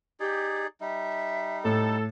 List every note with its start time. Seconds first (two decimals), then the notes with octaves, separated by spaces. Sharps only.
0.20 D#4 G4 G#4 D5
0.81 G3 D#4 E5
1.65 A2 A4